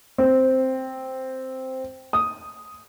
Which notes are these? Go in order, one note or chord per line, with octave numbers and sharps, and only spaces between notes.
C4
D#6